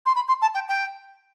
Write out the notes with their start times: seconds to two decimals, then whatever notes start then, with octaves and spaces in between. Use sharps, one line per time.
0.06 C6
0.15 B5
0.28 C6
0.42 A5
0.54 G5
0.69 G5